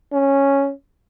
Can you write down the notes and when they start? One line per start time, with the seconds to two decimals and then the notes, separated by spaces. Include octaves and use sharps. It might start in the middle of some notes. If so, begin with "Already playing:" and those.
0.12 C#4